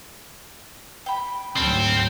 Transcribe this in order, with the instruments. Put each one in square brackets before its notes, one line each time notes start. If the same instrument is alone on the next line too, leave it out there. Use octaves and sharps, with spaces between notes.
[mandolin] G5 B5
[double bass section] D2 G#2 F#3 [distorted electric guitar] C4 [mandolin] C#4 A5